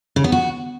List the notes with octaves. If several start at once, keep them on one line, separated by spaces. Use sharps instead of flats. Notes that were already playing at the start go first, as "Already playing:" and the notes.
C#3
B3
F#4